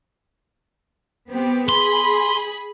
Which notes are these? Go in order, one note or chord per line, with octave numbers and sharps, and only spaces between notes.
B3 C4 G4
G#4 B5 C6